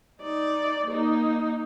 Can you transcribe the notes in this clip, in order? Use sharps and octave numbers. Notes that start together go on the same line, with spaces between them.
D#4 D5
A#3 D#4